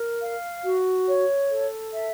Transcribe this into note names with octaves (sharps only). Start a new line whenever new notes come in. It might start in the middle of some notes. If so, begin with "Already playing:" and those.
Already playing: A#4
F5
F#4
C#5
A4
E5